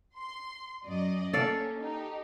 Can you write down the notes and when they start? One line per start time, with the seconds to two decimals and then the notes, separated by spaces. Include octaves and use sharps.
0.16 C6
0.85 F#2 D5 D#5
1.33 A#3 C#4 A4 D5 F5
1.80 D#4 G4